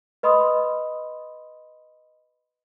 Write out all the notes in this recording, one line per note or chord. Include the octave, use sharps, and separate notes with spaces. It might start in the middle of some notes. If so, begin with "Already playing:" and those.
B4 D#5 B5 C6 D#6